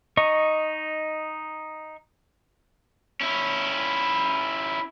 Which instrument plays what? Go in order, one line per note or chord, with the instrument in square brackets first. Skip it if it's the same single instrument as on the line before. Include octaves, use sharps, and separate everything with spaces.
[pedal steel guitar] D#4 D#5 C#6
[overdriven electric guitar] C#4 E4